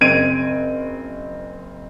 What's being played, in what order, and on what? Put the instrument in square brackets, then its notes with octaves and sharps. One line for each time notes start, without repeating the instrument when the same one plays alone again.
[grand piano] F#1 C4 G#6 D7 D#7